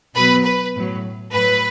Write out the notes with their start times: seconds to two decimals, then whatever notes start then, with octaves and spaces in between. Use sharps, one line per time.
0.15 B2 F#3 B4
0.45 B4
0.75 A2 F#3
1.33 A2 F#3 B4